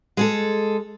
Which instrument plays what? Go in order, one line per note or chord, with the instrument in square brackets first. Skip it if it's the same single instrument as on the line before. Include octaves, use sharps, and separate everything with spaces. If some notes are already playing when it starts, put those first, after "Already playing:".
[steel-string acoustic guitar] G#3 G#4 A4